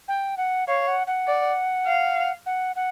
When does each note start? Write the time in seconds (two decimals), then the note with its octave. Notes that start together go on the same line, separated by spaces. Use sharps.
0.08 G5
0.37 F#5
0.67 C#5 F5
0.87 F#5
1.07 F#5
1.27 D5
1.87 F5
2.46 F#5
2.76 F#5